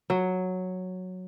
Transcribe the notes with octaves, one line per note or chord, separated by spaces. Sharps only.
F#3